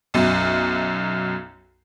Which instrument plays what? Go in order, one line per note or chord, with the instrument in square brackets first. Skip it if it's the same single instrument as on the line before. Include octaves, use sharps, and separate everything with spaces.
[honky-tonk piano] B1 F#2